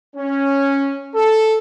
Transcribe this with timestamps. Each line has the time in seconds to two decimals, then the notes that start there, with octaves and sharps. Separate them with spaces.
0.16 C#4
1.15 A4